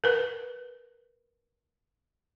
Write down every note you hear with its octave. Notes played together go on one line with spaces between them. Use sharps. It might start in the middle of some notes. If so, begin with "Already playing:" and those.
A#4 B4